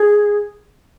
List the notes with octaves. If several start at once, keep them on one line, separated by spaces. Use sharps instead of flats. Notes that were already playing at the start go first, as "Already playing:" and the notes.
Already playing: G#4